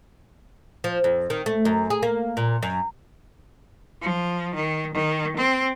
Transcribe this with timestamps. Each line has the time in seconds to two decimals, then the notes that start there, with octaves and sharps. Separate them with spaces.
0.84 F3
1.04 F2
1.30 D#3
1.46 A3
1.65 F#2
1.90 G#4
2.03 A#3
2.37 A#2
2.63 F#2
4.02 F3
4.55 D#3
4.94 D#3
5.37 C4